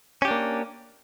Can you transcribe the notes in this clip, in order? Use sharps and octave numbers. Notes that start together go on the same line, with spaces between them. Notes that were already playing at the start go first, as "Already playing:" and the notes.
A#3 C#4 D4 G4